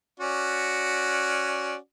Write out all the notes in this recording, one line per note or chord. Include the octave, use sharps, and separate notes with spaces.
C#4 F#4 D5